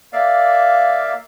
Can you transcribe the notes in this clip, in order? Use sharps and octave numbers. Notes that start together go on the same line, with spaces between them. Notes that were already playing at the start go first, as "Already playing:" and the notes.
A#3 D5 E5 F5